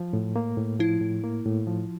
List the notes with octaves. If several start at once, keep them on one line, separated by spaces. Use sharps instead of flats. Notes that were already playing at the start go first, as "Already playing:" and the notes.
Already playing: F3
A2
A#3
A2
F3 E4
A2
A#3
A2
F3